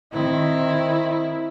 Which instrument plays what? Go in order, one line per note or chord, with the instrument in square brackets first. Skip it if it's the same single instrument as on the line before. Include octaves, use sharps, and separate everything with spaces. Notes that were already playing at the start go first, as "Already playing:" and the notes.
[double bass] D#3 C4 [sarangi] E4